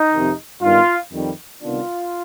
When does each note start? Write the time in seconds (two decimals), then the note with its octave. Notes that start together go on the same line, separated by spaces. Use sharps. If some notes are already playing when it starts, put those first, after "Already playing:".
Already playing: D#4
0.13 F2 C3 D#3
0.62 G2 D#3 B3 D4 F4
1.12 F2 D#3 G3
1.61 C2 C3 D#3 B3 D4 F4